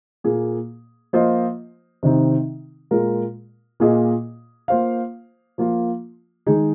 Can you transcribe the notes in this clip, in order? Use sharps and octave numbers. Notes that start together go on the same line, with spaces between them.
A#2 A#3 G#4
F3 A#3 F4 C5 D#5
C3 D#3 C4 D#4
A#2 G#3 F4 A#4
A#2 A#3 F4 G#4 D#5
A#3 F4 C5 F5
F3 A#3 F4
D#3 G#3 D#4 G#4